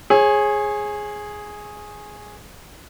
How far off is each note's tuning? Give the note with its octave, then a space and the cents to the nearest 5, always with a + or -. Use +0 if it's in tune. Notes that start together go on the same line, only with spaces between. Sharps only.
G#4 +0 C#5 -30